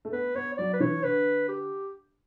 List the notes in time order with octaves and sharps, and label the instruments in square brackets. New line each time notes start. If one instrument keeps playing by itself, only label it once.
[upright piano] A3
[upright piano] B3 [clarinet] B4
[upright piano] B3 [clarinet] C#5
[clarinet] C#5
[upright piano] F#3 [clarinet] D5
[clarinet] B4
[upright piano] E3 [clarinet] C#5
[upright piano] D3 [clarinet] B4
[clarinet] G4